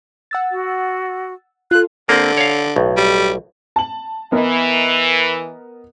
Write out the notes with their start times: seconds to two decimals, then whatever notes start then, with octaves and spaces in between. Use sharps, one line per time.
0.31 F#5 E6 A6
0.51 F#4
1.71 F4 A4 F#6
2.09 D3 A#3 C4
2.37 C#5 F5
2.76 B1 A2
2.97 G3
3.76 A5 F#7
4.32 E3 B3 A#4 D#5